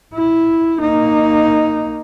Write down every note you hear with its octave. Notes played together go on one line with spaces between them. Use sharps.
E4
A#3 D#4